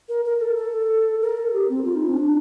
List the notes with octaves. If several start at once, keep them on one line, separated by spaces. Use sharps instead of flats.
A#4
A#4
A4
A4
A#4
A4
G4
C4
F4
D#4
C4
D4